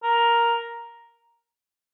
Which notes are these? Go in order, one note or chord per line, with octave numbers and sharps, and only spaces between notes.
A#4